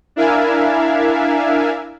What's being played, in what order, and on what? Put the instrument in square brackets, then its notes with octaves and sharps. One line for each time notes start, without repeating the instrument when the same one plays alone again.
[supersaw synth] D4 E4 A#4 E5 F5 G#5